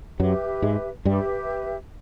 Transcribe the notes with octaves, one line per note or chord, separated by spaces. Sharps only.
F#2 F#3 G4 B4 E5
G#2 G#3
G2 G3 G4 B4 E5